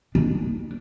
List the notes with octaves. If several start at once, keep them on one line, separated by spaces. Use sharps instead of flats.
D4